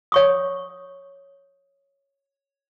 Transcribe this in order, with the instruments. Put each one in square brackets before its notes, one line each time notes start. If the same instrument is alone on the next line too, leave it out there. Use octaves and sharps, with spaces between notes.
[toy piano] C#5 C#6 D#6